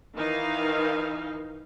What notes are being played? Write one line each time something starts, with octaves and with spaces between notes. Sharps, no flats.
D#3 E3 D#4 F5